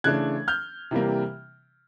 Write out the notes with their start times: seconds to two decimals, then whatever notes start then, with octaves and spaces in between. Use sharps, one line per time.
0.04 C#3 E3 A3 D4 F#6 G#6
0.48 F6 G6
0.91 C3 E3 G3 A#3